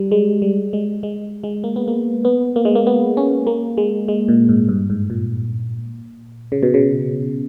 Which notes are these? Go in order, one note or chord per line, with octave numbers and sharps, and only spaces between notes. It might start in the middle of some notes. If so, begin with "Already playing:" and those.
Already playing: G3
G#3
G3
G#3
G#3
G#3
A#3
B3
A#3
B3
A#3
G#3
A#3
B3
C#4
A#3
G#3
G#3
A#2
G#2
G2
G#2
A#2
C#3
B2
C#3